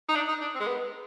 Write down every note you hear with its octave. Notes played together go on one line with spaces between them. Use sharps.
D#4
D4
D#4
D4
C4
G#3
B3